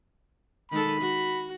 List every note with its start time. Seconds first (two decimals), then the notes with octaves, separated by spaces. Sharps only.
0.71 D#3 G#3 A4 B5
1.01 F#4